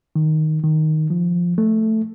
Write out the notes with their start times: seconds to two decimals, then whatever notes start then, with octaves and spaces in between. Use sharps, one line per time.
0.16 D#3
0.64 D#3
1.10 F3
1.58 A3